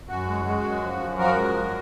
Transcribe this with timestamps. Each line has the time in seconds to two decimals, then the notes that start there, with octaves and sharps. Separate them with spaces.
0.09 F#2 F#4
0.27 G#3
0.45 G#3
0.63 F#2
0.81 F3
1.00 F#2
1.18 F3 F#4 A#4
1.36 G#3
1.55 F#2